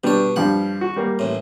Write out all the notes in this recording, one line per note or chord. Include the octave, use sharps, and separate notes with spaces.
B2 G3 D4 C#5
G2 F3 G3 F#5
F#4
G3 A#3
A1 A2